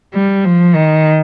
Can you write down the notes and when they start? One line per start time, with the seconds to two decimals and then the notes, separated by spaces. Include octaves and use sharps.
0.14 G3
0.45 F3
0.75 D#3